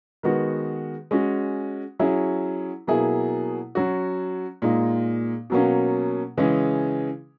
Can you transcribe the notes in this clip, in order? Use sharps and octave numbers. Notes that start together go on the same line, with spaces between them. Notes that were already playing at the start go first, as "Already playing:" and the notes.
D#3 G#3 B3 F#4
G#3 C#4 F#4
F#3 C#4 E4 G#4
B2 F#3 A#3 E4 G#4
F#3 C#4 F#4
A#2 G#3 D#4
B2 F#3 A#3 C#4
C#3 E3 G#3 C#4 G#4